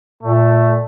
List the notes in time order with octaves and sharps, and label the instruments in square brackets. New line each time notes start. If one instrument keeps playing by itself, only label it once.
[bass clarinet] A#2 [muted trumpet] A3